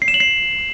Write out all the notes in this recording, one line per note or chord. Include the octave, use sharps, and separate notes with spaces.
C7
E7
F#7
C7